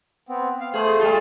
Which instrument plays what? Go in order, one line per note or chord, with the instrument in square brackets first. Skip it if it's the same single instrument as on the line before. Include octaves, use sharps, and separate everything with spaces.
[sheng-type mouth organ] B3 C4
F5
[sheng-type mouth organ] A3 C5 [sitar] G#4
[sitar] G3 F4 [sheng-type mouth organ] A4